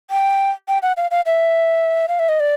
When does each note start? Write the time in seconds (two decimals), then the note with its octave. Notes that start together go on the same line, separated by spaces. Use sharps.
0.11 G5
0.68 G5
0.82 F#5
0.97 F5
1.11 F5
1.26 E5
2.08 F5
2.19 E5
2.29 D#5
2.40 D5